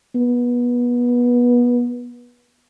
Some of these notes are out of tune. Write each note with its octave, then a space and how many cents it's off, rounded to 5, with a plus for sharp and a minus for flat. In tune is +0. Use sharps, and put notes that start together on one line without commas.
B3 -25